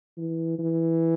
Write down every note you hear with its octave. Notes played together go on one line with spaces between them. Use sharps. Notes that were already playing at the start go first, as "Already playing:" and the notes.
E3
E3